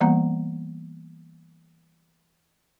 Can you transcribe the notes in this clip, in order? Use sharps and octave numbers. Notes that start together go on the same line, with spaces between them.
E3 G3 A#3 B3 F#5 A#5